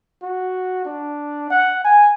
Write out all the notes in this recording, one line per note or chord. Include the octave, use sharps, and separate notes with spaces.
F#4
D4
F#5
G#5